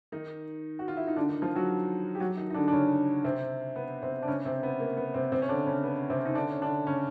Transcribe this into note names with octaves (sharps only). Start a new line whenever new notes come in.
D#3 D#4
F#4
F4
E4
D#4
D3 D4
D#3 D#4
F3 F4
F#3 F#4
G4
F#3 F#4
D#3 D#4
D#4
D3 D4
D4
C#3 C#4
C3 C4
B3
C3 C4
D4
C#3 C#4
C3 C4
B3
A#3
B3
C3 C4
C3 C4
C#4
D3 D4
C#3 C#4
B3
C3 C4
D#4
D3 D4
C#4
D3 D4
C#3 C#4